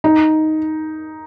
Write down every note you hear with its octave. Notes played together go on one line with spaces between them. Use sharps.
D#4